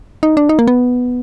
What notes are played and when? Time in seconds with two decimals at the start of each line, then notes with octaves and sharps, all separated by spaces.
0.23 D#4
0.37 D4
0.49 D#4
0.59 A#3
0.67 B3